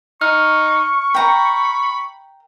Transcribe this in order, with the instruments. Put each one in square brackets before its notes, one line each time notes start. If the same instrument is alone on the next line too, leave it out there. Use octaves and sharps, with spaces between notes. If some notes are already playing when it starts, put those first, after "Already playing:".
[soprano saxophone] D#4 [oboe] C#6 [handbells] F6
[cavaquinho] G5 A#5 [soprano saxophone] B5